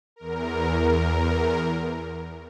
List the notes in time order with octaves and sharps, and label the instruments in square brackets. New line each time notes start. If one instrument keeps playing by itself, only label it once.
[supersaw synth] E2 A#4